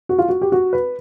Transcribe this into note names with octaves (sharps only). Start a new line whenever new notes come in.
F#4
F4
F#4
G4
F#4
B4